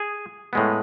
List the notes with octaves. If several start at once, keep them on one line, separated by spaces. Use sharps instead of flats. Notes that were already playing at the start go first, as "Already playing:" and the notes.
Already playing: G#4
A2 G#3 B3